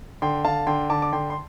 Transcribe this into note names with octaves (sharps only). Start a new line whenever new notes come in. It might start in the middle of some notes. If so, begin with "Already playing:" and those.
D3 G5 C6
D3 F5 A5
D3 G5 C6
D3 A5 D6
D6
D3 G5 C6
C6